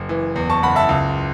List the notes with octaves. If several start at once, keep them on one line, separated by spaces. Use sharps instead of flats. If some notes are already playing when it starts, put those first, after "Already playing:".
Already playing: F#1
E3
E2
A5 C#6
F#1 F#5 B5
E5 A5
C#2